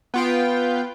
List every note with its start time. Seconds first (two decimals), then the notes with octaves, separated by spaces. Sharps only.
0.14 B3 F4 G5